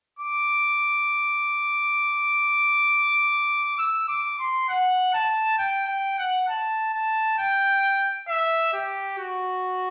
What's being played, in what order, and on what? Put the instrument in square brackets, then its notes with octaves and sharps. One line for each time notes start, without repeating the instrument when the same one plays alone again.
[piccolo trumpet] D6
E6
D6
C6
F#5
A5
G5
G5
F#5
A5
A5
G5
E5
G4
F#4